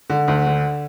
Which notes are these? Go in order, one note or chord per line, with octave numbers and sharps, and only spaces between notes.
D3
D2
D3